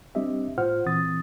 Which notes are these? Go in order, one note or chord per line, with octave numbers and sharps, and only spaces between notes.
G3 C4 D4 G4 D#5 E5
A2 F4 C5 F#5 F6
A#2 E3 C4 D#6 A6